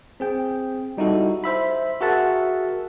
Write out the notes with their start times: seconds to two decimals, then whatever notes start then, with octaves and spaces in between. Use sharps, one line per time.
0.20 C4 G#4 G5
0.97 G3 D#4 E4 F#4 A4
1.44 C5 E5 B5
2.01 F#4 G#4 A#4 E5 F#5 A5